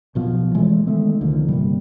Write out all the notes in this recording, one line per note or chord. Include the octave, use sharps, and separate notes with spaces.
B1 B2 F3
E3 G#3 A3
D#3 G#3 A3 B3
C2 D3 D#3 F3
G1 C3 G3 A#3